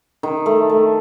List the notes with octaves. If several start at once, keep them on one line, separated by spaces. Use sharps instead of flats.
D#3
A3
A3